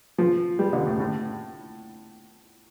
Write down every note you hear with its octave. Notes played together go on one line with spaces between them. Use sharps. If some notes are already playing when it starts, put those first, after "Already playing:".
F3
G3
D3
A2
A2